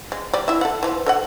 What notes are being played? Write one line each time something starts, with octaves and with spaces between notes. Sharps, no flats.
G#3
G3 D5
E4 E5
A4 F#5
E3 F3
A4 D#5 F#5